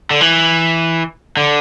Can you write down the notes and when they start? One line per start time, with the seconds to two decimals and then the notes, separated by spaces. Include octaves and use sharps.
0.11 D3
0.21 E3
1.37 D3